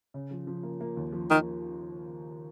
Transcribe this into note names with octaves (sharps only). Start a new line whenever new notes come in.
C#3
F3
F3
A#3
A#3
D#2
F3
D#3 A#3